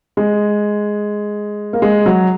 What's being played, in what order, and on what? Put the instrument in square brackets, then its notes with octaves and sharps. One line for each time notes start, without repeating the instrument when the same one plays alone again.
[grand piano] G#3
A#3
G#3
F#3